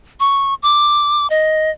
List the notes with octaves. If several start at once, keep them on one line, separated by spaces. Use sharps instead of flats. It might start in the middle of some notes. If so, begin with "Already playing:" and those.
C#6
D6
D#5